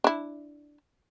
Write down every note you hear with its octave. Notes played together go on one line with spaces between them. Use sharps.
D4 E4